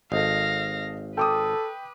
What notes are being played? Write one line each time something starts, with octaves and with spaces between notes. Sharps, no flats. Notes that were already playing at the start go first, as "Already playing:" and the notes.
G#1 A4 D#5 F5 A#6
A4 B4 G5 D6 D#6